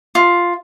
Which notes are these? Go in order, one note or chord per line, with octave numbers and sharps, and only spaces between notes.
F4